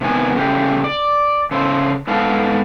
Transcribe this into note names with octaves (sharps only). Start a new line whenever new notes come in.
C3 D#3 B3 G#5
C#3 A3 G4 G#4
D5
C#3 A4 C5
G#2 B3 A4 F5 A5